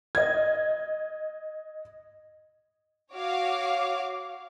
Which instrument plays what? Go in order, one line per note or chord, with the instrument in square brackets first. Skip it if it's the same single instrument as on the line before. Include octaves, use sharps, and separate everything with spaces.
[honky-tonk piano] D#5 G#6
[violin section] F#4 C#5 F5 D6